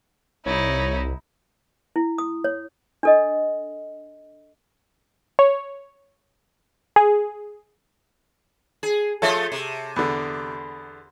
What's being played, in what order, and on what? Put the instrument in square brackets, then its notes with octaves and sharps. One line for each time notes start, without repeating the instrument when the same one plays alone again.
[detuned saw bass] C2 [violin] D#4 E4 [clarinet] C#5
[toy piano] E4
D#6
C#5
D4 A4 D#5
[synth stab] C#5
G#4
[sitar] G#4
[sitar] F3 A3 F4 [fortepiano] A4 C#5 E5
[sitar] C3
[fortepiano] E2 D3